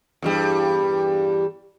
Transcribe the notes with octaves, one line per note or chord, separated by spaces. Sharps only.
E2 G2 G3